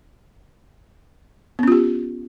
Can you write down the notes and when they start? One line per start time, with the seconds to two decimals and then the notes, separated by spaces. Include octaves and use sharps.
1.59 B3
1.63 C#4
1.68 F4
1.72 G4